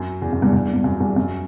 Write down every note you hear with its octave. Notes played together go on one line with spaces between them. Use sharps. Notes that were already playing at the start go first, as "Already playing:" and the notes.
Already playing: F#2
E2
F#2
E2 G2
E2 G2
G2
F#2
E2 G2
F#2